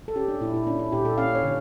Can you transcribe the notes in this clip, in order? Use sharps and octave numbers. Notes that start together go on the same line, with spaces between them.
A4
C#4 G4
D4
A#2 E4
E4
C#4 D4
E4
A#2 G4
A4
C#4 F5
C#5
D3